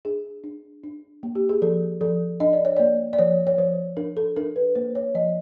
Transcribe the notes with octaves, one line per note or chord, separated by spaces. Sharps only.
D4 G#4
D4
D4
A#3
G4
G#4
F3 A4
F3 A4
D4 D#5
D5
C#5
A#3 D5
D5
F3 C#5
C#5
F3 C5
D4 A#4
A4
D4 A#4
B4
A#3 C5
C#5
F3 D#5